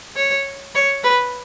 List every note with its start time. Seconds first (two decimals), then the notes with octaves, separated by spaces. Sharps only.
0.16 C#5
0.75 C#5
1.04 B4